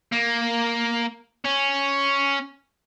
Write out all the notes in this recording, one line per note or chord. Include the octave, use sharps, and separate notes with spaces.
A#3
C#4